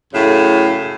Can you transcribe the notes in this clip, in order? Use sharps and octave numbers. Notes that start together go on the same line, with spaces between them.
F#2 A2 C#3 A3